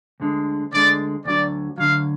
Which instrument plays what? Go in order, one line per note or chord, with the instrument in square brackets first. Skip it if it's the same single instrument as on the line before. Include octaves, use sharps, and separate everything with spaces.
[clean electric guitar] D2 D3 G#3
[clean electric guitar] D2 D3 G#3 [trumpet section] D5
[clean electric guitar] D2 D3 F#3 [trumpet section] D5
[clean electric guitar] D2 D3 F#3 [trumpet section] F5